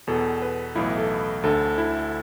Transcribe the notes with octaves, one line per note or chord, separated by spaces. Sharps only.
E2 B2 A4
B4
B1 A2 E3 E4
A4
D2 D3 A4
E4